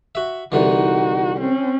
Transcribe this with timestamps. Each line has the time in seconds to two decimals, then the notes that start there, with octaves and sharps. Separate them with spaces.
0.15 F#4 E5
0.52 C2 D3 E3 D#4 F#4
1.39 C4 C#4